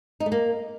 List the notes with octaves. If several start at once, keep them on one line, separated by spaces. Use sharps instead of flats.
D#4
A3
A#3